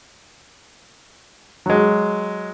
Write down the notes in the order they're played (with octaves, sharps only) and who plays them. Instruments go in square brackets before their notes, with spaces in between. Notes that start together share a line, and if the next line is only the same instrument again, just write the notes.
[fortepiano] F#3 G#3